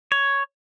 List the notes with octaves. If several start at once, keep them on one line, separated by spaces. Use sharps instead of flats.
C#5